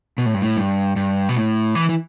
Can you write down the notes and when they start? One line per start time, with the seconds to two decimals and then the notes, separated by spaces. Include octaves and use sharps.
0.18 B2
0.26 A2
0.34 G2
0.42 A2
0.57 G2
0.96 G2
1.29 B2
1.35 A2
1.75 E3
1.89 E3